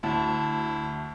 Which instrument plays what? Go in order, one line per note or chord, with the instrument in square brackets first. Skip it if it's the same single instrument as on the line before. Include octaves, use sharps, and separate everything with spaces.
[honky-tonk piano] D2 A5 [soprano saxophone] E4